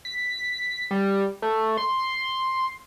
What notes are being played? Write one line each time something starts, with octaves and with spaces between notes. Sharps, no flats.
B6
G3
A3
C6